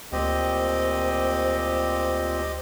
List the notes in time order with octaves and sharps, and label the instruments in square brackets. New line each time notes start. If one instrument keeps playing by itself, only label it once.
[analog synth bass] D2 [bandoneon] A#2 F3 C4 [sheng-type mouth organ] G4 D#5 [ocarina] C5